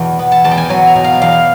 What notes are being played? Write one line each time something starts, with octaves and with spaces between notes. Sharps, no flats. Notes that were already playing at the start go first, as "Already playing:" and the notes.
Already playing: E2 B2
B3
A5
E2 A5
G5
G#5
F#3 G#5
A#5
B2
F5
E2 F5